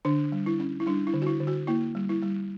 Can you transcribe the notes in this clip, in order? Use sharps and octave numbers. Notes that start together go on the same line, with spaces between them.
D3 D4
G3
E4
C#4
E4
G3 D4
E4
D3
F#4
E4
D3
F#4
A#3 E4
G3
E4
G3